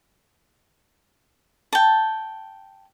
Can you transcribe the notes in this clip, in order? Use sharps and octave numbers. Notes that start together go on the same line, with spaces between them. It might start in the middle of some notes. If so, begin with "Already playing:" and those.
G5 A5